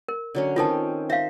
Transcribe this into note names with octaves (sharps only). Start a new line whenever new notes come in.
A#4
D3 F#3 C#4
D#3 C4 C#4 F4 A4 A5
C5 E5 F5